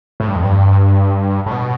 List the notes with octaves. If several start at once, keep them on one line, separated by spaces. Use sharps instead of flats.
A2
G2
F2
G2
A2
B2